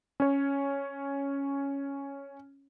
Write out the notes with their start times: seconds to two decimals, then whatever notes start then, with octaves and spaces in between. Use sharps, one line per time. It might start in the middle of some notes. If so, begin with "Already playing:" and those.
0.20 C#4 C#5